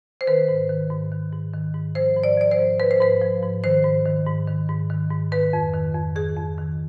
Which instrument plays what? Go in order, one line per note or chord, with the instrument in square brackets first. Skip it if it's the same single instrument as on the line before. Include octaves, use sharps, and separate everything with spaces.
[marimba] C5
D#3 B4
G#2
D#3
G#2
D#3
G#2
D#3
G#2
F3 C5
G#2
D5
F3 D5
C5
G#2
F3 B4
C5
G#2 B4
F3
G#2
D#3 C5
G#2
D#3
G#2
D#3
G#2
D#3
G#2
D#3 B4
F2
D#3
F2
D#3 G#4
F2
D#3